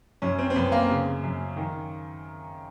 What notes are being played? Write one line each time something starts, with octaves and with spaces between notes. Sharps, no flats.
F#2 C#4
C4
C4
F#2 B3
A#3
C#3
F#2
D#3